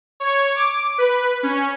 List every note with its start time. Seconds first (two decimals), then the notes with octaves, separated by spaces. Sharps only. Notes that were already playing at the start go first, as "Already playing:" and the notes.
0.20 C#5
0.56 D6
0.98 B4
1.43 C#4